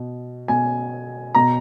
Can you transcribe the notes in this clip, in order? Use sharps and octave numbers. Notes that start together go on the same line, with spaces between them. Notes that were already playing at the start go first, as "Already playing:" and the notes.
Already playing: B2
B2 G#5
B2 A#5